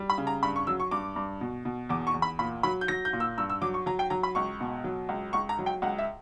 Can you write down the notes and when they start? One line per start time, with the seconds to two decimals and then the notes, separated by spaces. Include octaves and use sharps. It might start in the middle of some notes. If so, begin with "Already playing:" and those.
Already playing: G3
0.10 B5
0.18 C#3
0.27 A#5
0.43 G2 B5
0.56 C#6
0.67 F#3 E6
0.80 C#6
0.91 G2 D6
1.16 G2
1.41 B2
1.65 B2
1.89 E2 D6
2.07 C#6
2.14 E2
2.22 B5
2.39 A#2 B5
2.63 F#3 B5
2.81 G6
2.88 F#3 A#6
3.05 G6
3.13 A#2
3.20 E6
3.38 G2 E6
3.50 E6
3.61 F#3 D6
3.74 C#6
3.86 F#3 A#5
3.99 G5
4.10 F#3 A#5
4.23 B5
4.35 C#2 C#6
4.60 B2
4.84 F#3
5.09 C#2
5.33 C#2 C#6
5.49 A#5
5.59 F#3
5.66 G5
5.82 C#2 F#5
5.98 E5